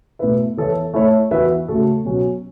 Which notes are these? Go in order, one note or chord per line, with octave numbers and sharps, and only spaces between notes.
B2 A3 E4 B4 E5
E3 B3 A4 C#5 E5
A3 E4 C#5 E5
E3 B3 F#4 B4 E5
C#3 A3 F#4 A4
B2 F#3 C#4 F#4